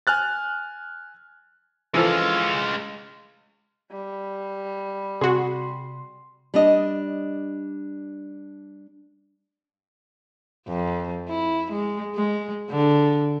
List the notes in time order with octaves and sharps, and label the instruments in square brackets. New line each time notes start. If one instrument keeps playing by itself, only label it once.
[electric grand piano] G#5 F6 F#6 A6
[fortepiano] E3 F3 A4 [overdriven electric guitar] G#3 F5
[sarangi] G3
[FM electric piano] C3 C6 [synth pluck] F#4 G#4
[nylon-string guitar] G3 D4 D#5
[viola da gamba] F2
E4
G#3
G#3
D3